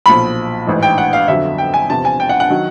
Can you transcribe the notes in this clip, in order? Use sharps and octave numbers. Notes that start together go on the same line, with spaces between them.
B1 A#2 F3 B5
A1 G#2 E3
G5
F#5
F5
G1 F2 D3 F#3 E5
G5
G#5
E2 C3 F3 A5
G#5
G5
F#5
F#5
D#3 F#3